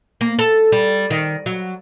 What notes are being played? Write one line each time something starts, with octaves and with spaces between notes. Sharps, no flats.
A#3
A4
G3
D#3
F#3